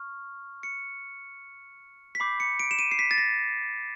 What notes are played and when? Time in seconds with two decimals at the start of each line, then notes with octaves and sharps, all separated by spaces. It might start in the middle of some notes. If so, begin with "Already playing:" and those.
Already playing: C#6 F6
0.63 C#7
2.15 B6
2.20 B5 D6 G6 C7
2.40 C#7
2.59 D7
2.71 E7
2.79 D#7
2.91 C7
2.99 B6
3.11 A6
3.18 A#6